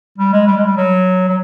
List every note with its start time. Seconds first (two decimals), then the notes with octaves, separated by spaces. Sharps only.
0.19 G3
0.33 G#3
0.47 G3
0.57 G#3
0.66 G3
0.76 F#3
1.29 F#3